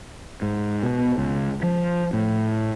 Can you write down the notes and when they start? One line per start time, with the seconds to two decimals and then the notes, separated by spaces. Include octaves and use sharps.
0.42 G#2
0.83 B2
1.18 C#2
1.63 F3
2.13 A2